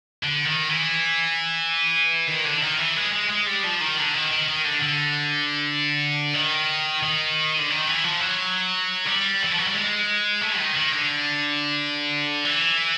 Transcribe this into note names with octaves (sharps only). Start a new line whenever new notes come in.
D3
D#3
E3
D#3
D3
D#3
E3
G#3
G#3
G#3
G3
F3
D#3
D3
D#3
D#3
D#3
D3
D3
D#3
D#3
D3
D#3
E3
F3
F#3
G3
E3
F3
F#3
G3
G#3
A3
D#3
D#3
D3
E3